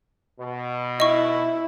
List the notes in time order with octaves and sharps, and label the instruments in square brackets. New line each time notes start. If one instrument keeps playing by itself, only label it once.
[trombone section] B2
[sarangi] E4 [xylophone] D#5 C#6